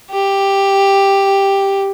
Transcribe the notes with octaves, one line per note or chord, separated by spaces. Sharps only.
G4